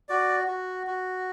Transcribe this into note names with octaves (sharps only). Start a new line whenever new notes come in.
F#4 D5
F#4
F#4